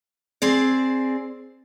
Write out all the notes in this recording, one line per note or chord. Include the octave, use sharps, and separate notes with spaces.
C4 G#4 D5